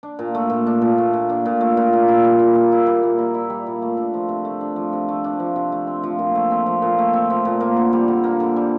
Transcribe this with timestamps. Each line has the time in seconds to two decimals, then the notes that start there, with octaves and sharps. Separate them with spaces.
0.03 D4
0.19 A#2
0.35 A3
0.50 A#2
0.67 D4
0.82 A#2
0.98 A3
1.13 A#2
1.29 D4
1.46 A#2
1.61 A3
1.77 A#2
1.93 A#3
2.08 E4
2.24 G3
2.39 A#2
2.55 A#3
2.72 E4
2.87 G3
3.03 A#2
3.18 A#3
3.34 E4
3.50 G3
3.67 A#2
3.82 A3
3.97 D4
4.14 F3
4.29 C3
4.45 A3
4.61 D4
4.76 F3
4.93 C3
5.08 A3
5.24 D4
5.40 F3
5.56 C3
5.72 A3
5.87 C4
6.03 F3
6.19 A#2
6.35 A3
6.50 C4
6.66 F3
6.82 A#2
6.99 A3
7.13 C4
7.30 F3
7.45 A#2
7.61 A#3
7.77 D3
7.93 G3
8.08 D3
8.24 A#3
8.40 D3
8.56 G3